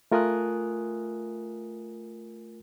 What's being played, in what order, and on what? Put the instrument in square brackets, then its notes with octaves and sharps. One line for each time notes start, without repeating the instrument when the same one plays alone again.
[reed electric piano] A3 F4 A#4 G#5 D#6 F#6